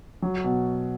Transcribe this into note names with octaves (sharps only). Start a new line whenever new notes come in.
F#3
B2